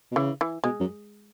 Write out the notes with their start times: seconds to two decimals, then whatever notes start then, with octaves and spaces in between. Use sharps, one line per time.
0.12 B2
0.16 C#3 E3
0.41 E3
0.64 B2 G#3
0.80 F#2